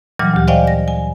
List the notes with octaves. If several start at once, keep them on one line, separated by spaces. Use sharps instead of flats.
A#2 E3 F#3 G3 F6
D2 G4
C5 D5 D#5 F5 G5 G#5
A#6
G#5